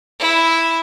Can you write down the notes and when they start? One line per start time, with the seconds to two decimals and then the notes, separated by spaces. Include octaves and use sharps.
0.20 E4